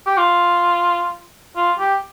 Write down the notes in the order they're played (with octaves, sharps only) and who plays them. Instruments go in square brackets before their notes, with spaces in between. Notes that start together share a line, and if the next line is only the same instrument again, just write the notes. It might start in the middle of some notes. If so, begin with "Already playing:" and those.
[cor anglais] G4
F4
F4
G4